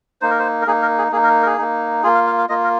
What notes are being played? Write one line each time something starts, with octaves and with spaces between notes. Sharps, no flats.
A#3 D#4 C5
A#4
C5
A#4
A#3 D#4 G#4
A#4
G#4
A#3 D#4 G#4
A#4
A#4
G#4
A#3 D#4
A#3 F4 G#4
F5
F5
F5
A#3 F4 D#5
A#4